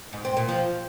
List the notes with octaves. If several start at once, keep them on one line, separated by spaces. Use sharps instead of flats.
G#2
C4
A#2
F3